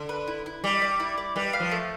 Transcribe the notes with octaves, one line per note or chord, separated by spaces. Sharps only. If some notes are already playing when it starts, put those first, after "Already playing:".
Already playing: D3
B4
E4
E4
G3 D5
D5
E4
D5
G3 B4
F5
F3
A3